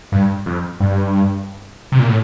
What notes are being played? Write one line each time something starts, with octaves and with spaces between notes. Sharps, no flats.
G2
F2
G2
C3
A#2
A2